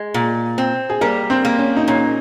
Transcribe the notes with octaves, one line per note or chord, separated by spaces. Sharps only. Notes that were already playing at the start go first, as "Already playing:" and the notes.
Already playing: G#3
A#2
C4
G#4
G3 A#3 A#4
C4 C5
A#3
C#4
D#4
A#2 C#4